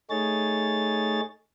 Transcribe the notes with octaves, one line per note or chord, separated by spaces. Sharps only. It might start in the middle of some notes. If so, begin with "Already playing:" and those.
A3 D#4 G#4 C#5 A6